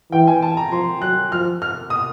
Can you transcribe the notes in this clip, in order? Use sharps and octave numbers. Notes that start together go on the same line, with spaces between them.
E3 G5
G#5
A5
A#5
F3 C6
F#3 F#6
F3 F6
F6
D#6